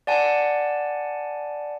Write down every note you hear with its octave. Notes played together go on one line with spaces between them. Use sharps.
D5 F#5 G#5 A5